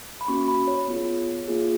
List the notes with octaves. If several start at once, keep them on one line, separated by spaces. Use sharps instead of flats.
B5
A#3 C#4 F#4 C#6
B5
C#5
B3 F4 G#4
A#3 F4 G#4